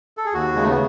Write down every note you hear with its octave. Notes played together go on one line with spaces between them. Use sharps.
A4
G#4
D#2 F#4
C#3 G#3
A3
B3